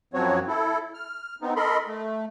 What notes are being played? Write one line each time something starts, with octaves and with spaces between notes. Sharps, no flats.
F#2 F3 F#3 C4 F#4 C#5
E4 A4
F6
B3 C4 D#4
A4 A#4 D#5 B5 C6
A3